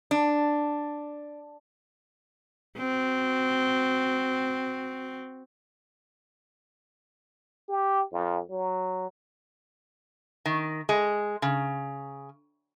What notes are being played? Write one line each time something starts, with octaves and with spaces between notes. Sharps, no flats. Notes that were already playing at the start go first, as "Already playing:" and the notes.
D4
C4 F#4
G4
F2
F#3
D#3
G#3
C#3